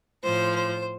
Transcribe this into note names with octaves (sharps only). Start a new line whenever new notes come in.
A2 F3 C5
C5